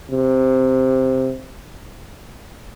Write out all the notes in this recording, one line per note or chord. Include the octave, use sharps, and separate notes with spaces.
C3